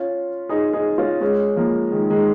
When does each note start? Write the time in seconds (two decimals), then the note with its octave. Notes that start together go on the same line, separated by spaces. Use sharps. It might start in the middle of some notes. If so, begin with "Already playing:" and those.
Already playing: C#4 F4
0.49 D#4 G#4
0.73 D#4 G#4
0.98 C#4 F4
1.21 G#3 C#4
1.56 F3 A#3
1.92 D#3 G#3
2.10 D#3 G#3